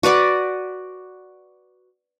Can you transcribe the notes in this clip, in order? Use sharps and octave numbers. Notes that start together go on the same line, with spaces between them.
F#4 B4 D5 F#5